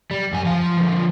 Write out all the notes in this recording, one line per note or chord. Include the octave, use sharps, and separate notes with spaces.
G3
F#2 G#5
F3 F5
D3 F3